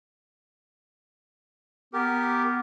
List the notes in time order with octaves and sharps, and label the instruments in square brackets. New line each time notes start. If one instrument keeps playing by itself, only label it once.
[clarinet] B3 [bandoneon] G4 A#4